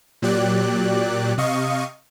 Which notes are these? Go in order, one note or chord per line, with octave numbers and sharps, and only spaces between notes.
A#2 F#3 G4 D5 F#6
C3 D#5 F5 C#6 D#6